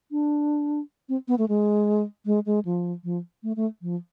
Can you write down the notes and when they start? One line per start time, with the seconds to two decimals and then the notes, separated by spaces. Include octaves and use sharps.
0.12 D4
1.09 C4
1.28 B3
1.38 A3
1.48 G#3
2.26 G#3
2.46 G#3
2.65 F3
3.04 F3
3.43 A3
3.56 A3
3.82 F3